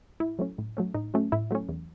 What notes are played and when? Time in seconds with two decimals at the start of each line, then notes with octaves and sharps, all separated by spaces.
0.20 A2 E4
0.39 F#3 A3 C#4
0.58 A2
0.77 F#3 A3 C#4
0.94 A2 D#4
1.14 F#3 A3 C#4
1.32 A2 E4
1.51 F#3 A3 C#4
1.69 E2